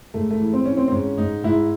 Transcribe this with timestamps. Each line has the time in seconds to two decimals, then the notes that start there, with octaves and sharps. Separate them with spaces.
0.14 G#2 A3
0.31 A3
0.40 E3
0.53 C4
0.65 E3 C#4
0.77 C4
0.88 C4
0.92 G#2 C#4
1.18 G#2 D#4
1.44 G#2 E4